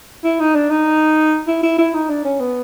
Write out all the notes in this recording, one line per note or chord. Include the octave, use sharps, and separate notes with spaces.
E4
D#4
D4
D#4
E4
E4
E4
D#4
D4
C#4
B3